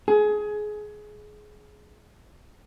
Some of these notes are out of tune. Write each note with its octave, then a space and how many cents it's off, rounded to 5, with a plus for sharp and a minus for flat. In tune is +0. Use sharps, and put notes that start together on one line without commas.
G#4 +20